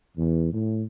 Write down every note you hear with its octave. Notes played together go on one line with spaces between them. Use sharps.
E2
A2